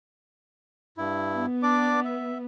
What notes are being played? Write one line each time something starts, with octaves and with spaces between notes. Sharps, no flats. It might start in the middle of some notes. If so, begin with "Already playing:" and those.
G2 E4
B3
D4 D5 D6
E5